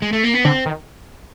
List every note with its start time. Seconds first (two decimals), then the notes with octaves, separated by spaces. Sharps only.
0.02 G#3
0.13 A3
0.24 A#3
0.34 B3
0.44 D3 C4
0.66 D#3